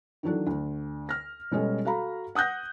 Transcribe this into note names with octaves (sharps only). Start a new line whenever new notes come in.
D#3 E3 F#3 D4 A4
D2
F6 A#6
B2 G3 G#3 C#4 A4 D#5
F#4 A4 F5 A#5 B5
F#5 D#6 F#6 G6 A#6